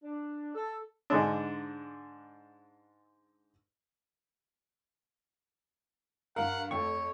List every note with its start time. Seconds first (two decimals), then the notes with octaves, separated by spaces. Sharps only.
0.04 D4
0.54 A4
1.10 G#2 D3 G#3 D4
6.36 G2 A#4 F5 F#5
6.71 F2 A3 A4 C#5 G5 C#6